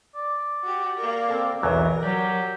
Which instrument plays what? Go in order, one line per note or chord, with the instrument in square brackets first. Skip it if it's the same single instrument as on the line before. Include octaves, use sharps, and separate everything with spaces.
[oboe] D5
[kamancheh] F#4 G4
A#3 A#4
[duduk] C4 [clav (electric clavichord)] A4 F5 A5
[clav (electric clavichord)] B1 E2 F#3 [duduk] E3 [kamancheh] A#4
[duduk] F#3 [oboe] G4 [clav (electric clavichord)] D5